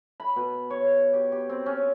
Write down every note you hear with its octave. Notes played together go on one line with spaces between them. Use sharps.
B5
B2
C#5
G4
G4
C4
C#4